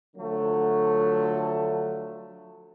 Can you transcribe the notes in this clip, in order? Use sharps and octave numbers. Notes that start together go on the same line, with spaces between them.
D3 F3 F#3 A3